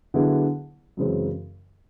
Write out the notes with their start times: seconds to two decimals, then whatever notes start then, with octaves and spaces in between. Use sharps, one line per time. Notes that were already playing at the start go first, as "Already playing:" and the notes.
0.14 D3 F#3 B3 E4 G#4
0.97 F#2 C#3 E3 G#3 C4